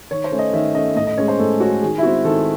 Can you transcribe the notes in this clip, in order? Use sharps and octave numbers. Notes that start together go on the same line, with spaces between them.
D#3 C#5
C5
A3 C#4
D#5
D#3 E5
A3 C#4 D#5
A2 D#5
D#5
G#3 C#4 C#5
C5
A2 A4
G#3 C#4 F#4
D#3 G#4
E4
G#3 C4 F#4
D#3 A4